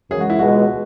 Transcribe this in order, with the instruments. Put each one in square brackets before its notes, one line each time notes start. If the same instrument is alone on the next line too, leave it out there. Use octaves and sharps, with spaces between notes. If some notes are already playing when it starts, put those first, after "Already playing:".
[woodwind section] F#2 C#3 E3 G#3 [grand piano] G#4
[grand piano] F#4
E4
[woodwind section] C#2 B2 G#3 [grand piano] F#4